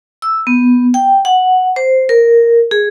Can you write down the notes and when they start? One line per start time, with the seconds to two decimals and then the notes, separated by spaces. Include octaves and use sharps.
0.22 E6
0.47 B3
0.94 G5
1.25 F#5
1.76 C5
2.09 A#4
2.71 G#4